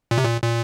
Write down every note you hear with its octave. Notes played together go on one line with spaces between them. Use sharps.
A#2
C3
A#2
A#2